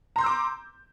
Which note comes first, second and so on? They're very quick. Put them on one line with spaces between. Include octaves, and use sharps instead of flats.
A#5 C6 G6 E6 D6